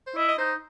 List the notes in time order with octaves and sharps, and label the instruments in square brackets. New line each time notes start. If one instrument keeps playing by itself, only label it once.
[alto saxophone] C5
[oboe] E4 [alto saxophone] D#5
[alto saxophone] D#5
[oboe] D#4 [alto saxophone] C5